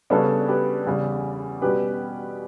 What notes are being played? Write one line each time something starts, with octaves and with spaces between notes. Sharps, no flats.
C#3 G3 B3 D4 A4 C#5
G4 B4
E2 C#3 G3
B2 G3 C#4 G4 B4